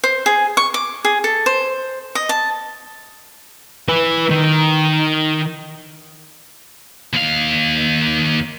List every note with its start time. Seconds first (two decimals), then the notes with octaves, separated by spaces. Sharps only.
0.04 C5
0.26 G#4
0.57 C#6
0.74 D6
1.05 G#4
1.24 A4
1.46 C5
2.15 D#5
2.29 A5
3.89 E4 B4
4.30 D#3
7.13 D#2 F5